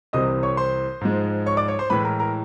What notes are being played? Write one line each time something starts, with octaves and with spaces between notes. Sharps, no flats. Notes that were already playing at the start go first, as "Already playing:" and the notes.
C2 C3 E3 G3 C4 D#5 D#6
C#5 C#6
C5 C6
G#2 F3 G#3
C#5 C#6
D5 D6
C#5 C#6
C5 C6
A2 E3 G#3 B4 B5
A#4 A#5
A#4 A#5